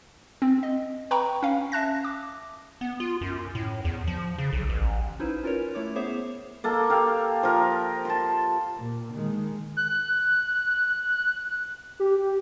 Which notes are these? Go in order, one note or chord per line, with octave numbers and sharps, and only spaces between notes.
C4
D#5
B4 G5 A#5 B5 C#6
C#4 F5
E5 A5 F#6 A#6
D6
B3
F4
F#2
A2
E2
F3
C#3
B1
A1
C#4 D#4 E4 B4 C5
C#4 F4 A#4 B4 C#5
A3 E4 C#5 D6
B3 G#4 C5 C#5 E5 D6
A#3 A4
G4 F5
F3 A#4
A5 C6
A#2
D#3 G#3
F#6
G4